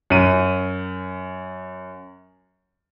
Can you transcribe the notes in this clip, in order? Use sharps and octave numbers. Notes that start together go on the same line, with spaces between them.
F#2 D#7